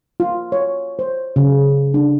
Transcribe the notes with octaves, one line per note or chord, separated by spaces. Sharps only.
F4
C#5
C5
C#3
D4